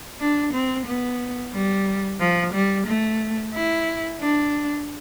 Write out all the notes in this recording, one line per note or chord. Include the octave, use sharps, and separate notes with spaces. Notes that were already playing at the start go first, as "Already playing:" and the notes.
D4
C4
B3
G3
F3
G3
A3
E4
D4